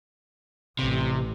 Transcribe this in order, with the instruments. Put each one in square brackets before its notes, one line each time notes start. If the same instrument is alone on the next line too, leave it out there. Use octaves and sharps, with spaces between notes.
[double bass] A1 [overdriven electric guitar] C3